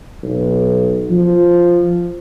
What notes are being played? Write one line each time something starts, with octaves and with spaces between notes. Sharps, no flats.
B1
F3